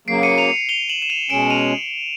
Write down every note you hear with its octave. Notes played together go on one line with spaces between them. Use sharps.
C#3 F#3 A#3 C7 D7
C#7 D#7
D#7 F7
F7 G7
E7 F#7
E7
D#7 F7
B2 G#3 C#4 D7 E7
D#7 F7